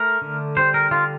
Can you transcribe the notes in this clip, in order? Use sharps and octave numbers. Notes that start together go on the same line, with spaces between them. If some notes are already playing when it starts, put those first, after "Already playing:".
Already playing: A3 A#4
D3
G3 C5
A#4
D3 F4